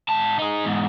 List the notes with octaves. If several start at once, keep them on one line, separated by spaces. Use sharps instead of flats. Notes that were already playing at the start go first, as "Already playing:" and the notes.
G#2 A5
D#4 G#4
E2 G#2